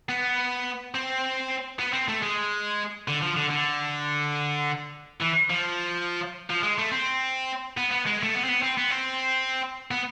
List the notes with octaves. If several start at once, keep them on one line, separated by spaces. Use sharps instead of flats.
B3
C4
B3
C4
A3
G#3
D3
F3
D3
D3
E3
F3
F3
G#3
A3
C4
B3
B3
G#3
A3
B3
C4
B3
C4
B3
C4
B3